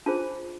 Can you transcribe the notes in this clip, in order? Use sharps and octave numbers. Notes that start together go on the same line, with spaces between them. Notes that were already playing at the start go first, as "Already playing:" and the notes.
D4 F4 G#4 C5 A5